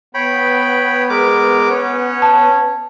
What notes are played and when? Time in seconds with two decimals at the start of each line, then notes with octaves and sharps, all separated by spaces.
0.14 B3 C#5 G5 B5
1.10 G#3 A#4 D6
1.70 C#4 C#5
2.22 A5